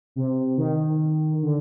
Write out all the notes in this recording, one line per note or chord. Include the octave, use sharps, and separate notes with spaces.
C3
D#3
D3